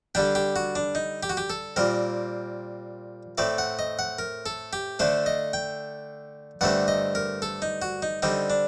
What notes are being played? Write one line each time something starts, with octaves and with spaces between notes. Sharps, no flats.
D3 G3 D4 G4
G4
F#4
D4
D#4
G4
F#4
G4
A4
A#2 G3 C4 A#4
A2 A3 C4 D5
F#5
D#5
F#5
A#4
A4
G4
D3 A3 D4 C5
D#5
G5
G2 D3 A3 C4 F#5
D#5
A#4
A4
D#4
F#4
D#4
D3 G3 C4 D#4
D4